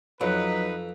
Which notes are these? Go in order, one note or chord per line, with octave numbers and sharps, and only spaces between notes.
F2 F#3 D#4 B4